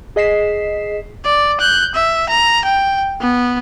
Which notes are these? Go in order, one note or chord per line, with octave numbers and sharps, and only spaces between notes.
G#4 D#5 B6 C7 E7
D5
F#6 G6
E5
A#5
G5
B3